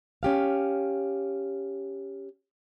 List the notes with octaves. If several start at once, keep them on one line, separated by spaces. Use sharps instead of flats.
C#4 G4 F5